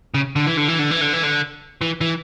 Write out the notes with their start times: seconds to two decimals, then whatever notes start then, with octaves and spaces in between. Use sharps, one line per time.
0.14 C#3
0.36 D3
0.46 E3
0.57 D3
0.68 E3
0.79 D3
0.91 E3
1.01 D3
1.13 E3
1.23 D3
1.81 E3
2.01 E3